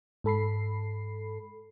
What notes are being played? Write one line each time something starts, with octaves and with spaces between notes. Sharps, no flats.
G#2 A4 B5 C7